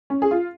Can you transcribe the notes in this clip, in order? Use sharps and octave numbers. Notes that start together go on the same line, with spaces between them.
C#4
G#4
F4